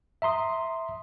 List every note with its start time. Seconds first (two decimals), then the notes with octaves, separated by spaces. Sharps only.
0.22 E5 A#5 C6 D#6